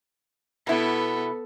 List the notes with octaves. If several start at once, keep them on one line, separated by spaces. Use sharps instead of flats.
B2 B3 E4 A4